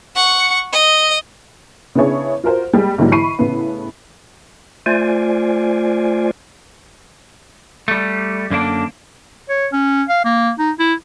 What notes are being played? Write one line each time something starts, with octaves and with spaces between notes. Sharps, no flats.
F#5 C#6
D#5
C#3 B3 D4 E4 G#4 C#5
F4 F#4 A#4 C5
G3 G#3 A#3 G#4
G#2 D3 E3 F#3 G3 A#3
E3 B5 C#6 C7 D#7
A2 C#3 E3 B3
A3 F4 C5 D5 G#5
G3 A3
F#2 D3 A#3 D4
C#5
C#4
F5
A#3
D#4
E4